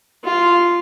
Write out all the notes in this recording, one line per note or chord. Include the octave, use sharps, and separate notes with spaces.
F4